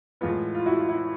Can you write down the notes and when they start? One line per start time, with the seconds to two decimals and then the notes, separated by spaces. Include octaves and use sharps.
0.21 A2 E3 G#3 B3 F4
0.55 F4
0.66 E4 F#4
0.78 F4
0.89 E4